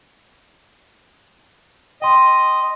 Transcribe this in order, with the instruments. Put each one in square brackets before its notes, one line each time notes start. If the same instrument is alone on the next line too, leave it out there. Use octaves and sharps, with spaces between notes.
[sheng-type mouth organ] D#5 [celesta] G5 C6